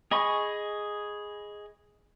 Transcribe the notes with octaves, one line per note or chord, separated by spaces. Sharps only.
G#4 D#5 G#5 B5 C#6